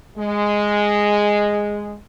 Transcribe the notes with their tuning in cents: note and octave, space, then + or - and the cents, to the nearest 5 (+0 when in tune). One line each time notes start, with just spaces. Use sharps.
G#3 -5